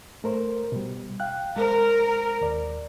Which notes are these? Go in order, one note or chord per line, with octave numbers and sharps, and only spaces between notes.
A3 A#4 C5
B2 G3
F5 G5 F#6
G#3 A#4 C5
D#2 D5